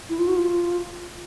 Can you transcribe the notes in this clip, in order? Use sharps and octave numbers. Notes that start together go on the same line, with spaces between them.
E4
F4
F#4
F4